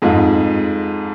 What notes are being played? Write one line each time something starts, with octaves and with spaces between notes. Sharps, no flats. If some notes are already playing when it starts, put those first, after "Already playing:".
F2 G#2 F4